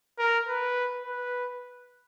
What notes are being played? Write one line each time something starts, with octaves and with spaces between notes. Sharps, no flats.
A#4
B4
B4